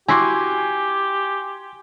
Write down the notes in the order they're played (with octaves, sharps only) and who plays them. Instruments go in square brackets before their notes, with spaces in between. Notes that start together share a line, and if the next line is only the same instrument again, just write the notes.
[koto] E4 F#4 [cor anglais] G4 [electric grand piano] G#5 C6 D6